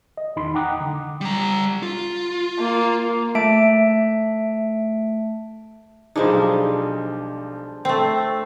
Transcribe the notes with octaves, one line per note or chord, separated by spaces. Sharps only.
D#5
E2 D#3 D#4 B5 C6
F#5 G5 A#5 D6 D#6 F#6
D3
G3 A#5
F4
A#3
A3 E5 A5 D7
B1 F3 G3 G#3 D4 D#4 C5
A3 C4